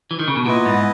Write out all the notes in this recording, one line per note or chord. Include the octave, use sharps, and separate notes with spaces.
E3
D#3
C#3
B2
A#2 B3 E4 B4 D#5
G#2